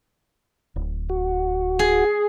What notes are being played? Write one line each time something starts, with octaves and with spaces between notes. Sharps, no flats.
D1
F#4
G#4